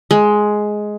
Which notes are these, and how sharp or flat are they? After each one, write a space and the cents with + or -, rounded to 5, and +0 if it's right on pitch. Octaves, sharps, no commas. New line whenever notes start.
G#3 +10